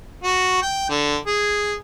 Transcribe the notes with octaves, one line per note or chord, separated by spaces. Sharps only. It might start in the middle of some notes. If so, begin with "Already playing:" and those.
F#4
G5
D3
G#4